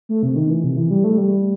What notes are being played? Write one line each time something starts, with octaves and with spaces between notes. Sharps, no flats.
A3
C3
D#3
E3
C3
E3
G3
A3
G3